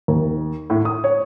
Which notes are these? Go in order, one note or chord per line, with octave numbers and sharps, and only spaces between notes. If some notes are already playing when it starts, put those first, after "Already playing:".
D#2
A2
D#6
C#5